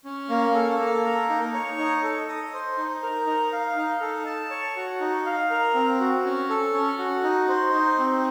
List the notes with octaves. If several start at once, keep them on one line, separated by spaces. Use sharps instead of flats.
C#4
A#3
A4
A#3
A#4
D#4
C#5
D#4
A4
D#5
C5
D#4
A#4
D#4
F5
D#4
A4
A5
C#5
F#4
D#4
F5
A#4
C4
F#4
C#4
A4
C#4
F#4
D#4
C5
D#4
C4